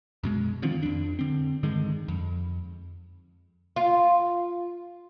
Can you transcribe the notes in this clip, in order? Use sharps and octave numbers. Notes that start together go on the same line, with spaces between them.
F#2 B2 G#3
D3 D#3 F3 C4
F2 D4
D3 C4
G2 D3 D#3 G#3
F2
F4